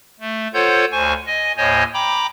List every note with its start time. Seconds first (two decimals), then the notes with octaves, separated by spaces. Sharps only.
0.20 A3
0.54 F4 A4 C5 C#5 F#5 G6
0.92 D2 C5 G#5 C#6
1.27 D#5 G#5
1.57 D#2 A2 C5 C#5 D#5 G#5
1.94 G5 A#5 B5 D6